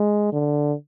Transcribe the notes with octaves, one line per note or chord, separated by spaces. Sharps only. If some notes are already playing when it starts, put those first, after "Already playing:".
Already playing: G#3
D3